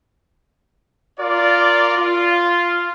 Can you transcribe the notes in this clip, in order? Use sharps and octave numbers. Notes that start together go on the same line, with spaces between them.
F4 A#4 D5
F4